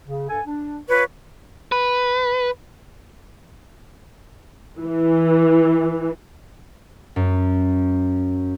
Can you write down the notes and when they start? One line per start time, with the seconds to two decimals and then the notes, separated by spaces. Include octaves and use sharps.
0.06 C#3
0.29 G2 A4 G#5
0.45 D4
0.89 F4 B4 C#5 C#6
1.72 B4
4.81 E3
7.16 F#2